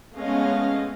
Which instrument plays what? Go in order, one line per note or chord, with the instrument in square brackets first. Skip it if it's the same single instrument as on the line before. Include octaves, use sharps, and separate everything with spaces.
[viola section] G#3 A3 B3 C#4 D#5 F5